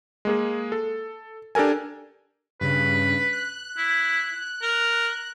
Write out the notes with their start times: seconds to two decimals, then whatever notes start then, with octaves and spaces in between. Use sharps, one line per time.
0.25 G#3 A#3 G#4
0.72 A4
1.55 D4 G4 A4 A#4 G#5
2.61 G2 C#3 B4
3.33 F#6
3.77 E4
4.62 A#4